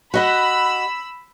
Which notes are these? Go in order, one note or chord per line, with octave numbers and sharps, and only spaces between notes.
F#4 D#5 F#5 B5 E6